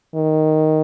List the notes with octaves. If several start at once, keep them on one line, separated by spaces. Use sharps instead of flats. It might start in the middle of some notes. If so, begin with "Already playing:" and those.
D#3